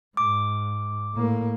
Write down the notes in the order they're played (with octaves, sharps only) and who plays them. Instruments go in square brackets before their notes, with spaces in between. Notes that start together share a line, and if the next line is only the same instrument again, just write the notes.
[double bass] G#2 [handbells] D6
[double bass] A2 A#3